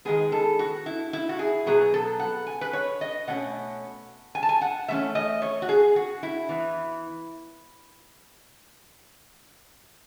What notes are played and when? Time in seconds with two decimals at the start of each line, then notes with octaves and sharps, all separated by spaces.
0.05 D#3 G#3 B3 G#4
0.32 A4
0.59 F#4
0.86 E4
1.13 E4
1.29 F#4
1.39 G#4
1.66 B2 F#3 B3 G#4
1.94 A4
2.20 F#5
2.47 G#5
2.61 B4
2.73 C#5
3.01 D#5
3.28 B2 A3 C#4 F#5
4.35 G#5
4.43 A5
4.49 G#5
4.61 F#5
4.88 E3 A3 C#4 E5
5.15 D#5
5.42 C#5
5.62 F#4
5.69 G#4
5.96 F#4
6.23 E4
6.49 E3 B3